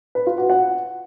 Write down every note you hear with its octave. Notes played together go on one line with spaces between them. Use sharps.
B4
F4
F#4
F#5